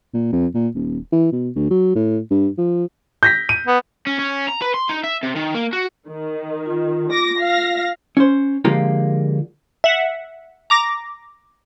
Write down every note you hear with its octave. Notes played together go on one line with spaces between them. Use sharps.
A#2
F2
A#2
D#1
E3
B2
D2
F#3
A2
G2
F3
G6 A#6 B6
D#7
B3
C#4
C#4
A#5
B4
C6
D#4
E5
C3
D#3
A#3
F#4
D#3
F4
D6 A#6
F5 A#6
C#4 C5
D3 F3 G#3 A#3 F4 G4
E5 F#5
A#5 D6 A#6